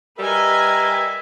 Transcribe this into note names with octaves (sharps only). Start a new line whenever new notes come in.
G3 A#4 B4 D#5 E5 G#5